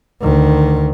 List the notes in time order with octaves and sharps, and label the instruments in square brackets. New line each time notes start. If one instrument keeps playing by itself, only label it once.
[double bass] D2 D#3